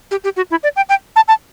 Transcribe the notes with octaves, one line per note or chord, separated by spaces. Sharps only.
G4
G4
F#4
E4
D5
G5
G5
A5
A5